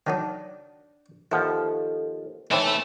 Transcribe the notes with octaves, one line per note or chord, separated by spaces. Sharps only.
D#3 F#3 D4 D#4
D#2 F3 E4 A4 F#5
E3 A3 C4 D#4 E4 C#5 E5